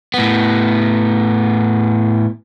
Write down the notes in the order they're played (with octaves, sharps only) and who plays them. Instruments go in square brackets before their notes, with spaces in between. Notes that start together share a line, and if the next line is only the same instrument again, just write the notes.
[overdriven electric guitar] A2 B3